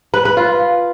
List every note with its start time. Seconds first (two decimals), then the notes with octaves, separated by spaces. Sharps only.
0.14 B4
0.25 B4
0.37 F4